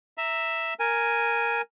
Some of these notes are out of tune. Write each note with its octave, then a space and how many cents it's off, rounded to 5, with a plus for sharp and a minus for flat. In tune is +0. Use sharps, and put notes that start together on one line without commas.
E5 +0 A#5 -5
A#4 +0 G#5 +0